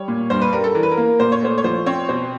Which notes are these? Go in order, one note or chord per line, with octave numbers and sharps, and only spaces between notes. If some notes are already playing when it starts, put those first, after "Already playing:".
Already playing: G3 C#5
A#2
G2 C5
B4
G3 A#4
A4
E3 A#4
B4
A#4
A#3
A#2 C5
C#5
A3 C5
C#5
F3 C5
C4 C#5
B2 C5